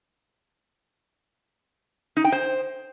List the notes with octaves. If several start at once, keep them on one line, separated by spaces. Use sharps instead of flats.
D#4
G5
C5